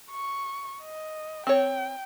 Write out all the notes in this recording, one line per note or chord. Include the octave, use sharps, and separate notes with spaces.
C#6
D#5
C4 C#5 G5